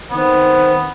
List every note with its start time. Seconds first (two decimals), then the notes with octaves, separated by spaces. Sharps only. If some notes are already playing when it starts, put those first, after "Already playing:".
0.11 D#3 B3 C4 C5